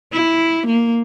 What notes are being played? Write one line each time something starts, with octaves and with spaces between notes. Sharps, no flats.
E4
A#3